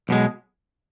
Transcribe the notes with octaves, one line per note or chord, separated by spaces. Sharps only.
B1 B2 G#3